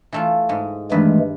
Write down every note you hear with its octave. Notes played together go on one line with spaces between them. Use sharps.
E3 A3 F4
G#2 G#3
G2 D#3 E3 G#3 A3 B4